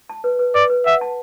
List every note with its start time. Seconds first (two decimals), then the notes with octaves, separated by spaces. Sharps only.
0.09 A5
0.24 B4
0.39 B4
0.54 B4 D5
0.70 B4
0.86 E5 F#5
1.01 A5